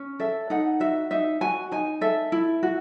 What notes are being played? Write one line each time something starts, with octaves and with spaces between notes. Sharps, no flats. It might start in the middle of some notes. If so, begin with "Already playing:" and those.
Already playing: C#4
A4 E5
D#4 F#5
F#4 E5
D#4 E5
F#4 G#5
D#4 G#5
A4 E5
E4
F#4